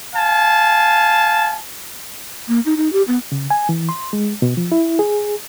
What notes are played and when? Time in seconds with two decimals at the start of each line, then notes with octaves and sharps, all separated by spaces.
0.14 F5 G#5 A5
2.48 A#3
2.66 D#4
2.77 D#4
2.93 G4
3.08 B3
3.32 C#3
3.50 G#5
3.69 E3
3.89 C6
4.13 G#3
4.42 B2
4.57 F3
4.72 E4
4.99 G#4